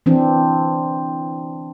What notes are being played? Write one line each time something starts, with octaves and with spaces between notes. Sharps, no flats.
E3 C4 D4